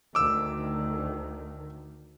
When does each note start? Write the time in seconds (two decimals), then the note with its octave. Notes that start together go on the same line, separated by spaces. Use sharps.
0.15 D2 D#3 D6 E6